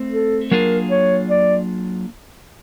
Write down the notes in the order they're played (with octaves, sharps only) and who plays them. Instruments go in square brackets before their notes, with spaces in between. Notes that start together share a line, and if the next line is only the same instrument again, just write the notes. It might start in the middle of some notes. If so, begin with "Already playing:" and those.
Already playing: [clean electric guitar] A3 C4
[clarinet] A4
[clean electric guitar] F#3 A#3 D4 F4 G#4 [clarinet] A#4
[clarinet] C#5
D5